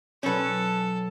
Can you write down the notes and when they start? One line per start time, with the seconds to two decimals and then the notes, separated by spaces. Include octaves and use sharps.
0.23 B2 F#3 C#4 D#4 A4 B4